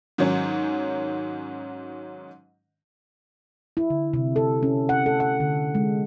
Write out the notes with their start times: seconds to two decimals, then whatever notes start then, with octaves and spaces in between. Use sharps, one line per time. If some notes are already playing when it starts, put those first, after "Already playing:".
0.18 G#2 D#3 F#3 C#4
3.77 E4
3.90 D3
4.14 C3
4.36 A4
4.63 C#4
4.89 F#5
5.06 A4
5.20 F#5
5.40 D3
5.75 G#3